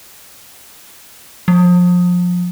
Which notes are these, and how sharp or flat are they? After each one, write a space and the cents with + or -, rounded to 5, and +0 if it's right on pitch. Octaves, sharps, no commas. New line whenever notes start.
F3 +30